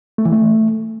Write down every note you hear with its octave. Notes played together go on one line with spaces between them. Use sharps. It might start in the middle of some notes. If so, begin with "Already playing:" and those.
A3
E3
A3